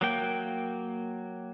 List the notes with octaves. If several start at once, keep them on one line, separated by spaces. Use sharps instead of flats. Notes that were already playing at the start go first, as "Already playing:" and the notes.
F#3 A#3 G5